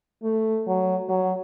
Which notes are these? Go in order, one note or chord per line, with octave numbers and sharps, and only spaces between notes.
A3
F#3
F#3